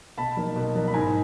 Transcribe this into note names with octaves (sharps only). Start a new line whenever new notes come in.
B2 A5 B5
F#3 A#3 D#4
B2
F#3 A#3 D#4
B5
G#2 G#5 A#5